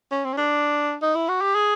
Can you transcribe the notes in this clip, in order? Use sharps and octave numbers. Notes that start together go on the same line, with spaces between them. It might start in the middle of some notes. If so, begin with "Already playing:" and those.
C#4
C4
C#4
D4
D#4
E4
F#4
G4
G#4